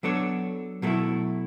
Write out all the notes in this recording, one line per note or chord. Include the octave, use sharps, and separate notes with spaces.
F#3 B3 D4 A4 C#5
B2 F#3 A3 E4